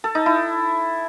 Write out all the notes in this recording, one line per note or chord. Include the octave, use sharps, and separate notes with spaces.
A4
D#4
E4